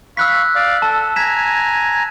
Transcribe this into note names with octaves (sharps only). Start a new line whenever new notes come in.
F5 B5 C#6 E6 F#6 B6
D5 F5
A4 A5
G#5 A#5 G#6 B6 E7